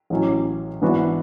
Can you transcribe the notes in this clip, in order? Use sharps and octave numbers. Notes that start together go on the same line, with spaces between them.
A1 A2 F#3 C#4
G#2 E3 B3 D4 F#4